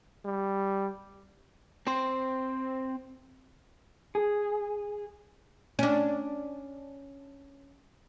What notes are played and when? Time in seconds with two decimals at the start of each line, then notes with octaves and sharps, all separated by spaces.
0.25 G3
1.87 C4 C5
4.15 G#4
5.79 C#4 D4